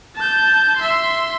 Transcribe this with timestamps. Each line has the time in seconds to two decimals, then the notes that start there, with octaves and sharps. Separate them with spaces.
0.16 A5 G6
0.77 E5 C6